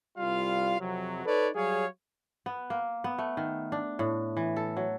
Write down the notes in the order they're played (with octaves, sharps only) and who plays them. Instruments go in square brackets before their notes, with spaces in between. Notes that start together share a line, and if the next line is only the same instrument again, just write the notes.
[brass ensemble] C2 G3 F4 F5
F2 C3 F#3
D#4 A4 B4 C#5 D5
F#3 G3 G#4 C#5 F5
[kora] B3
A#3
B3
A3
D#3
D4
A2
E3
A4
F#3